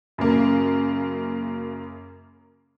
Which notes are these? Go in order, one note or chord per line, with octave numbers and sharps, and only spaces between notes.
F#2 C#3 A#3